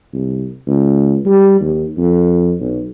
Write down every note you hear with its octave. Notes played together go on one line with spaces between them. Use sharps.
C2
C#2
G3
D#2
F2
B1